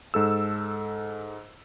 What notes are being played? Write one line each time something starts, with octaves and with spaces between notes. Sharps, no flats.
G#2 A4 E6